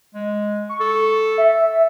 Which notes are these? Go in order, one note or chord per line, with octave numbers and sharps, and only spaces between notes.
G#3
C#6
A4
E5